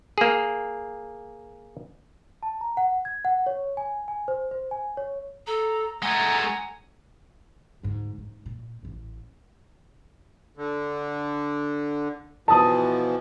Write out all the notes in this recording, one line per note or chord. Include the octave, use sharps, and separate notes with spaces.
A#3 G#4
A5
A#5
F#5
G#6
F#5
C#5
G#5
G#5
C5
C5
G#5
C#5
A4 A#5
G#3 A3 F#5 G#5 A#5
D2 G#2
G#2
A#2
A1 A2
D3
B2 E3 F3 A5 D#6